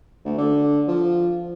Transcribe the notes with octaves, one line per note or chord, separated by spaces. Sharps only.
D2
D3
F3